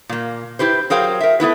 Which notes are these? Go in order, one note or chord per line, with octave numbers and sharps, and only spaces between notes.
A#2 A#3
E4 G4 B4 C5
F#3 G#4 A#4 C5 F5 G5
A#4 E5
A3 B3 E4 B4